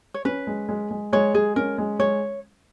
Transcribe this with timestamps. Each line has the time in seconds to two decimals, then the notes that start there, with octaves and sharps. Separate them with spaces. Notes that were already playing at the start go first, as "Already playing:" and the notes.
0.14 C#5
0.25 C#4 B4
0.47 G#3
0.69 G#3
0.91 G#3
1.13 G#3 C#5
1.34 G#3 G#4
1.56 C#4 A#4
1.78 G#3
1.99 G#3 C#5